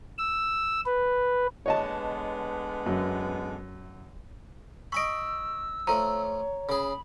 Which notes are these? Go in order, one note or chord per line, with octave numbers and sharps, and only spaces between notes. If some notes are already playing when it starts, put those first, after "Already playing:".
E6
B4
D3 G#3 B3 C#5 D#5 A5
F#2
D#5 G#5 B5 C#6 E6 D7
F3 A3 C#5 A#5
C#3 G#4 B5